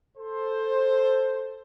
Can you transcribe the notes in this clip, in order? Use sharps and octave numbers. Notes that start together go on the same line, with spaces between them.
A4 C5